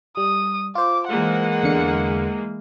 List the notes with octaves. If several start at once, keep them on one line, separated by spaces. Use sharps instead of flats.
G3 D#6
F4 C5 D6
E3 G#3 A#3 F#5
E2 D3 C#7